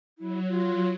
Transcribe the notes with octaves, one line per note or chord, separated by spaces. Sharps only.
F#3 E4
F#3 F4